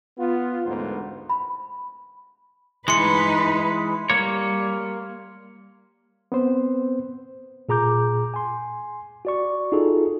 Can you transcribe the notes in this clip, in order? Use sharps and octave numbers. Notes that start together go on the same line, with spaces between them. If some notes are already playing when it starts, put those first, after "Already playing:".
B3 F4
A1 D2 G#2 A#3 B3 C5
B5
E3 G#3 D#4 B4 C6 C#7
G3 A#3 C#5
B3 C4 C5
A#2 G#4 A#5 D6 G6
G#5 C6
F#4 D5 C#6
D#4 F4 F#4 G#4 A4